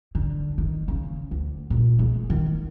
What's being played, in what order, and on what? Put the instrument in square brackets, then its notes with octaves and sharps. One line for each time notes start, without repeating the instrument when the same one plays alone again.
[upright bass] D3
D#3
C#3
D2
A#2
G#3
D#3